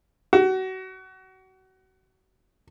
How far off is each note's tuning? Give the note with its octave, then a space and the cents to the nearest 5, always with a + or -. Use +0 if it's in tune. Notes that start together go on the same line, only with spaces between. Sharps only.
F#4 +30